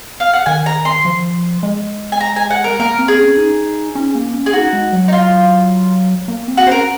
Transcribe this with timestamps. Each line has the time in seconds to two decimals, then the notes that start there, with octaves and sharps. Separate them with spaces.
0.20 F5
0.33 F#5
0.46 D#3 G#5
0.66 A#5
0.85 C6
1.05 F3
1.63 G#3
2.12 G#5
2.21 A#5
2.36 G#5
2.50 F#5
2.64 A#4
2.80 A#3 A#4
2.99 C4
3.08 G#4
3.18 C#4
3.37 D#4
3.95 C#4
4.15 A#3
4.34 C#4
4.46 G#4
4.53 D#4 F#4
4.73 G#3
4.93 F#3
5.08 D#4
5.12 F4
6.28 A#3
6.48 C4
6.57 F#4
6.67 C#4 A#4 C5